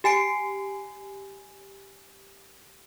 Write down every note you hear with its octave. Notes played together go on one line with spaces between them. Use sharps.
G4 G#5 C7 D7